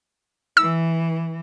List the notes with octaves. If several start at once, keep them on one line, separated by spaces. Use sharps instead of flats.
E3 E6